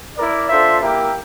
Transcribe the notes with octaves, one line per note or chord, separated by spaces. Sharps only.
E4 A#4 D5
D4 F4 A4 C5 E5
A#3 E4 G4 A#4 E5